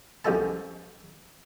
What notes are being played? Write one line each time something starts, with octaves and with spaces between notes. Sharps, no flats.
C2 F#2 F3 G#3 A4 A5